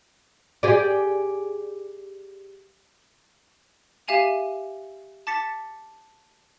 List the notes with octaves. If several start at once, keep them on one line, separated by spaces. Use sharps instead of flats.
G4 G#4 D5
G4 E5 F5 G#5 D#7 F7
A5 D6 A6 B6 C#7